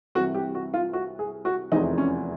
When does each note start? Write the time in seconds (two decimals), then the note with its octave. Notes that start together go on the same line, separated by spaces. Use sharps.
0.15 C2 C3 E3 F#4
0.34 G4
0.55 F#4
0.74 F4
0.93 F#4
1.19 G#4
1.45 F#4
1.72 F1 E2 C3 E3 D#4
1.98 C#4